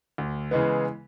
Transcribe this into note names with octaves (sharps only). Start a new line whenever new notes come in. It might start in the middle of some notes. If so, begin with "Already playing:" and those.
D2
C#3 E3 G#3 B3